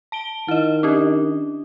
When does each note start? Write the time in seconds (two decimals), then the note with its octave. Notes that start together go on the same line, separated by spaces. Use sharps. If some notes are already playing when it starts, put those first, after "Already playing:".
0.12 A5 D7 G7
0.48 D#3 E4 D#5
0.83 C#4 D4 G4